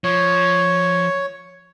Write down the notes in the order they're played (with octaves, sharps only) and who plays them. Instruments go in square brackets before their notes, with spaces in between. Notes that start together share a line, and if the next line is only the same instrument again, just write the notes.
[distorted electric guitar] F3 [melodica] C#5